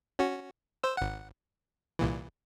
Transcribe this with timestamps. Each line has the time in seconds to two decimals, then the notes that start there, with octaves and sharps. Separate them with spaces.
0.19 C#4 F#4
0.83 C5 E6
0.97 G#1 F#5
1.99 C2 A#2 E3